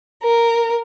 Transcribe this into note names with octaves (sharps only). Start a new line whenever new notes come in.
A#4